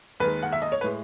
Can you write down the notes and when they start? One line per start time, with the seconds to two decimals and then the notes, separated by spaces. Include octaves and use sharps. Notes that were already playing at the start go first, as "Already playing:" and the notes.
0.20 D#2 D#3 G#3 B4
0.43 F#5
0.52 E5
0.62 D#5
0.72 C#5
0.81 B4
0.84 A2 G#3